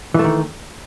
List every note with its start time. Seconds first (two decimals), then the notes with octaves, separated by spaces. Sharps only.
0.14 E3
0.19 A3
0.24 D#3